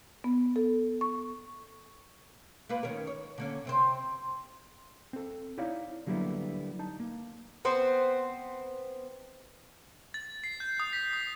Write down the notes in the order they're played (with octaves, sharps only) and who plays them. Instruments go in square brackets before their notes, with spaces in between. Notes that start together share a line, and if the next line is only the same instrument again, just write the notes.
[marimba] B3
A4
C#6
[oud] A#3 F4 B4
D#3 C#4 A#4
C#5
D3 A#3 C#4
C3 C4 C5
[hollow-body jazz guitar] C4 A4
D#4 E4 C#5 D5 F5
D3 F#3 G3 A#3 B3 E4
D#4 A5
A#3
[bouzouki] B3 C4 C5
[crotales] A6
C7
G6
D#6
B6
D#6